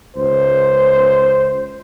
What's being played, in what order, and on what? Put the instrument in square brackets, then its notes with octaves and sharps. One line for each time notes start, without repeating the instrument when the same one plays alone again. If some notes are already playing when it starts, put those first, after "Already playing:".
[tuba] C#2 [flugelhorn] C5